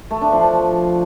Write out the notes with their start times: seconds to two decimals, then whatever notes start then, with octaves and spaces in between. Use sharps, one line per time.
0.11 A3
0.21 D4
0.32 F3
0.43 F3